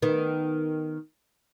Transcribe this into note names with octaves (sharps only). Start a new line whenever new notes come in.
D#3 B3